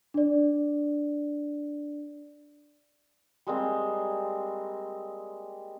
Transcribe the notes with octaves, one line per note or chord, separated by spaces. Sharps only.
D4 D5
G3 G#3 A#3 C4